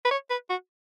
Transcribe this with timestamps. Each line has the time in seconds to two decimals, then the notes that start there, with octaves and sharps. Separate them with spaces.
0.05 B4
0.11 C#5
0.30 B4
0.50 F#4